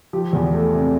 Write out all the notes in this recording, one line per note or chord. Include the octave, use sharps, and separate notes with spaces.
F3 G4
E2
A3
C3